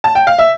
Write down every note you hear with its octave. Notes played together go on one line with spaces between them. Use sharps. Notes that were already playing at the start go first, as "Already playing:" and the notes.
A5
G5
F5
E5